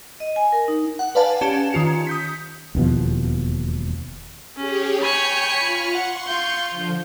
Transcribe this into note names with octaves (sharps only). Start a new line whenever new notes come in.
D#5
G#5
A#4
D#4
F#5
B4 D5 F5 G#5 A5
C#4 G4 A5 E7
D#3 C#4 F4 C#7
D#6 G6 B6
E1 D#2 B2 F3
C#4 G4 G#4 C#5
C#5 G5 G#5 B5 G6 C#7
F4 F6
F#5 C6 C#6
F4 G6
D3 F3